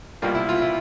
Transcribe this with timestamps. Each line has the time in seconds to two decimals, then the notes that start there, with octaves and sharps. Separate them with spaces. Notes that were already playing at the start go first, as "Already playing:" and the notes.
0.22 C2 B2 G3 A#3 F4
0.35 E4
0.49 F4
0.62 E4